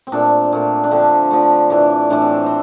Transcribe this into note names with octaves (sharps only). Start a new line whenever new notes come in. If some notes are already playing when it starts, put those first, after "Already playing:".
C4
A#2 A3 D4
A#2 A3
D4
D3 F3 A3 C4
D3 F3 A3
A2 E3 A3 D4
A2 E3 A3 D4
C4
C4